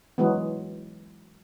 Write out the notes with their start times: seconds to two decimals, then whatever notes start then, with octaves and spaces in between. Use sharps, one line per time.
0.18 E3 F#3 G#3 B3